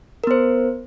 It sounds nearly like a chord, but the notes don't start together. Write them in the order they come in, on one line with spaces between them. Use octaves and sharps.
A#4 B3 C5